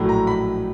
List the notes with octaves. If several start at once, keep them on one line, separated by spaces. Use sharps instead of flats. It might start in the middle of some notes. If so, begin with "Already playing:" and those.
Already playing: A#1 A2 F#3 A3
A#5
B5